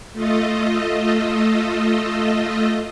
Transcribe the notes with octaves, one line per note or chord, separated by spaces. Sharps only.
A3 F4 A4 D#5